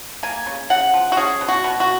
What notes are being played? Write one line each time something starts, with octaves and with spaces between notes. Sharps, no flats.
A#3 G#5
C#3
C#3 F#5
F3
F#4
C#4 G#4
B2
F#4
B2
F#4